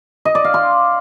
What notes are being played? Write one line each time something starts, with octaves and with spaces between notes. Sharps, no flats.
D#5
D5
F5
C6